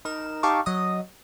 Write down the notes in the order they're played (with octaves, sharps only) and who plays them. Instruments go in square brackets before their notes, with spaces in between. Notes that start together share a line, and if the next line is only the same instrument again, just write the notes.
[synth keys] D#4 A#4 E7
D#4 G4 F5 A5 C#6 D6
F#3 D#5 D#6